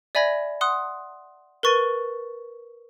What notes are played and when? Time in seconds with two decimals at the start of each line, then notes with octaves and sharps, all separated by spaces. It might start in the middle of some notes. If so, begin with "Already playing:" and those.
0.15 D5 E5 G#5 B5 G#6 A#6
0.61 F#5 C6 D#6 F#6
1.63 A#4 B4 C#6 A6 D#7